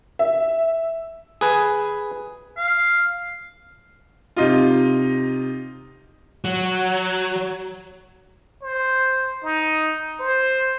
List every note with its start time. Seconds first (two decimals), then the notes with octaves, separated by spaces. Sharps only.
0.19 E5
1.41 G#4 B4 G#5
2.57 F5
4.36 C3 D#4 F4
6.45 F#3
8.62 C5
9.43 D#4
10.20 C5